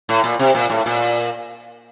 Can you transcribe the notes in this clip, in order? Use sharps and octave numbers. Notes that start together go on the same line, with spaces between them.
A2
A#2
C3
A#2
A2
A#2